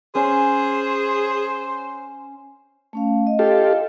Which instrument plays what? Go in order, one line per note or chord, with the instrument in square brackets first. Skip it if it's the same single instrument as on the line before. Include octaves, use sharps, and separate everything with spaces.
[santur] C#4 G#5 [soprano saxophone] G#4 [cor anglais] C5
[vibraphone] A3 C#4 F5
D#5
[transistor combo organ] F4 G4 A4